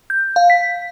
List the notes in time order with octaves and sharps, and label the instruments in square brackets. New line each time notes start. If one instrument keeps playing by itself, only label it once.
[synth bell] G6
F5
B6